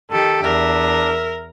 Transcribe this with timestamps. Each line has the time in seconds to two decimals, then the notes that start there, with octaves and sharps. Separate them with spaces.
0.11 D#3 G4 A4
0.43 E2 D4 A#4 E5